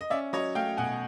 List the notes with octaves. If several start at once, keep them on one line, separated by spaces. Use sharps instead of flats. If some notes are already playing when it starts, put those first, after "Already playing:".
D#5
C#4 D5 E5
F#3 C#5 D#5
A3 F5 G5
B2 F#5 G#5